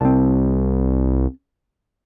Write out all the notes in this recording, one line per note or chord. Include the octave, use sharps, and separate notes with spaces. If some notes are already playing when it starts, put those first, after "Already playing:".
C2 C4 A5